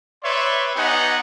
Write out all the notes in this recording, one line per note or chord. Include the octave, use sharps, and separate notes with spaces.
B4 C#5 D5 E5 C6
B3 D#4 G4 D#5 F#5 G#5